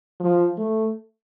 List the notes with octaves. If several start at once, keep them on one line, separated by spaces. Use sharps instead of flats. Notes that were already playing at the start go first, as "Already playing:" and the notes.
F3
A3